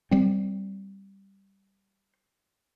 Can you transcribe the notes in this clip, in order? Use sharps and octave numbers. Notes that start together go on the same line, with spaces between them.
G3 C4